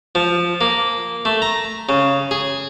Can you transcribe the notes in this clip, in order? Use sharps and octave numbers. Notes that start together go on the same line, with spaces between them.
F3
A#3
A3
A#5
C#3
G#4